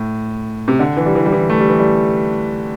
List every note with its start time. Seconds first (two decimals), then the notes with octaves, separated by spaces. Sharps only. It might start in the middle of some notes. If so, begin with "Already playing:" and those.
Already playing: A2
0.68 C3
0.79 D3
0.97 E3
1.06 G3
1.15 E3
1.26 G3
1.32 E3
1.50 A3
1.60 G3
1.69 E3
1.79 G3